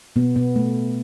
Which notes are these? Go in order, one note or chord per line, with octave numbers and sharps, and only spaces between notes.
B2 B3
B2 B3
A3